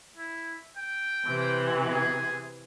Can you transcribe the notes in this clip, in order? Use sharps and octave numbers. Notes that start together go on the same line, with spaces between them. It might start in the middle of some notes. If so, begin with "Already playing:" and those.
E4
G5
C3 E3
G#4